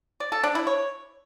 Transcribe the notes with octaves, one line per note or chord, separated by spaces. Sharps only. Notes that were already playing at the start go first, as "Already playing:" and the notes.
D5
A4
D4
E4
C#5